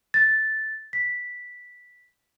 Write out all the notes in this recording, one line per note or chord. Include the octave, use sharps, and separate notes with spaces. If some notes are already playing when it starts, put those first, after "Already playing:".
A6
B6